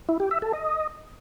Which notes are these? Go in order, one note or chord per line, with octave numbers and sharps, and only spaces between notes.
E4
G4
E5
A4
D#5